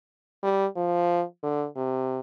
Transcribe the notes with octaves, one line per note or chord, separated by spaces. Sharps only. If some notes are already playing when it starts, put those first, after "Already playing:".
G3
F3
D3
C3